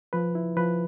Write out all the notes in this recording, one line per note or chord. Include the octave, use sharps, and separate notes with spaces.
F3 B4
E4
F3 B4